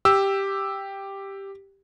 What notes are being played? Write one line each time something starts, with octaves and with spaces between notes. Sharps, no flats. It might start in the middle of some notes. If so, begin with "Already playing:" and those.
G4 E6